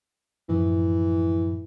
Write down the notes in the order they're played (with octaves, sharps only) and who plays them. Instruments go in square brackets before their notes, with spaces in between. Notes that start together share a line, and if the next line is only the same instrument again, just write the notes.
[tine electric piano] F#2 A2 F3 [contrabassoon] E3